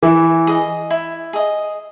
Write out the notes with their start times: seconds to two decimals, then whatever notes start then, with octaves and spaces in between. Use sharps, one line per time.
0.03 E3 E4
0.47 G#4 D#5
0.90 E4
1.33 G#4 D#5